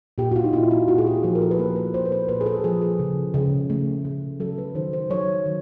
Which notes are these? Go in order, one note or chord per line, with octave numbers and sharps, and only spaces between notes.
A#2 G4
F#4
F4
D#4
A#2 E4
F4
A#2 F#4
G#4
G4
F3 G#4
A#4
A4
B4
A#3 A#4
B4
A#2 C5
B4
C5
A#2 B4
G#4
A4
F3 G#4
G#4
C#3
C#3
A3
C#3
F#3 A4
B4
D#3 C5
C5
F#3 C#5
D#3